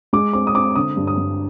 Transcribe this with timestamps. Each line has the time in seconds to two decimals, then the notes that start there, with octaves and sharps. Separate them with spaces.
0.13 G#3 D6
0.33 C4 D6
0.47 D#6
0.55 C4 D6
0.75 D3 D#6
0.97 G2
1.07 D#6
1.18 G2